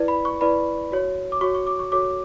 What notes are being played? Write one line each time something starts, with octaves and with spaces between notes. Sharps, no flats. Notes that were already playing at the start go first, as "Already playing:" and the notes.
Already playing: E4 B4 D5
B5
C#6
E4 B4 D5 B5
F#4 C#5
D6
F#4 C#5 C#6
C#6
D6
C#6
F#4 A4 C#5 D6